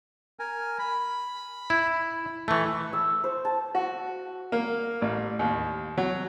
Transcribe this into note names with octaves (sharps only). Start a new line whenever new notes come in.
A#4 G#5
B5
E4
E3 A3 C#6
E6
C5
A5
F#4
A#3
A1
D#2
F#3